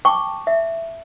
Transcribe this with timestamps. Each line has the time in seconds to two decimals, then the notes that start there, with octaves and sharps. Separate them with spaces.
0.05 G5 A5 C#6 D6
0.47 E5